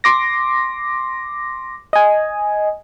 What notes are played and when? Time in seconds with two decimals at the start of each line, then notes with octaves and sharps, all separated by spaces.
0.04 C6 D6 A#6
1.93 D#5 G#5